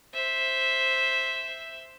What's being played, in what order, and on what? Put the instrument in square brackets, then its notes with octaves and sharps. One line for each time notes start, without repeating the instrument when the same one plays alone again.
[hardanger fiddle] C5 E5